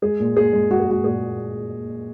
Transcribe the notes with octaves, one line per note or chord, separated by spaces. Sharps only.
G#3 G#4
A#2
A#2 G#4
G#3
G#3 F#4
G#4
G#3 F#4
A#2 G#4